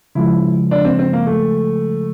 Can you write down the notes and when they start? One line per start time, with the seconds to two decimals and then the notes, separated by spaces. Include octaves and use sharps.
0.15 C#3 F3 G#3 E4
0.71 D4
0.85 C4
0.99 C4
1.13 A#3
1.27 A3